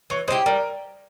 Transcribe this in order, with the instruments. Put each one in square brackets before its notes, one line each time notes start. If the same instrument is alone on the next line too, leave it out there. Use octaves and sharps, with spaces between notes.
[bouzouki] E3 [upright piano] C#5
[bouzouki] G#3 E4 G4 [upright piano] C5
[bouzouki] G3 [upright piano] A#4